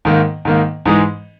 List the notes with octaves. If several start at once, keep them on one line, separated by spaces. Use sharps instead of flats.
G#2 D#3 A#3
G#2 D#3 A#3
G#2 E3 G#3 D#4 G#4